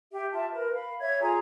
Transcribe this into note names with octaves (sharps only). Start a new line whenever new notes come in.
G4 E5
F4 E5 A5
A#4 B4
F5 B5
C#5 E5 G#6
F4 G#4 G#5 A#5